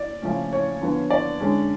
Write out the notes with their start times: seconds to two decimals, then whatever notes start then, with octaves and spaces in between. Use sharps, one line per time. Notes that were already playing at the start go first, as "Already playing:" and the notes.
Already playing: D5
0.22 C#3 F3 A3 C#4
0.53 C#5
0.81 D3 F3 B3
1.10 D5
1.40 D3 G#3 C#4